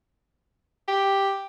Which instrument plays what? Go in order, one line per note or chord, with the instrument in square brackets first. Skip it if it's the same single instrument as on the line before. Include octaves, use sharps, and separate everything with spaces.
[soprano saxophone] G4